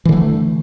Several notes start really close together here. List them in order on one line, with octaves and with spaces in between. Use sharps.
E3 D3 A3